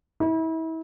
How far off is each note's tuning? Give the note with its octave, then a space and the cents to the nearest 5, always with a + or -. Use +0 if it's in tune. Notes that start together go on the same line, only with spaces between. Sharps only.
E4 -35